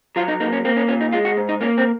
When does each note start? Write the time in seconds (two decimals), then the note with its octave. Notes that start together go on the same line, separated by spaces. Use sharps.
0.16 F#3 F4
0.28 D#4
0.40 A#3 D#4
0.53 C#4
0.65 A#3 C4
0.76 C#4
0.88 A#2 C#4
1.01 D#4
1.12 G#3 F4
1.25 F#4
1.37 G#2
1.49 D#4
1.61 A#3 C#4
1.78 C4